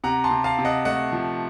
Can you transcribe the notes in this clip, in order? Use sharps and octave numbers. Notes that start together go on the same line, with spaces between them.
C3 F#5 A#5
A5 C6
C3
F5 A5
C3
D#5 F#5
A3 D#5 F#5
F3